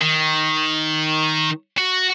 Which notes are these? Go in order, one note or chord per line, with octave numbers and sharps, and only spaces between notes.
D#3
F#4